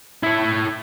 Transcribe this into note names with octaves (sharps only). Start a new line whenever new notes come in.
E4 C#5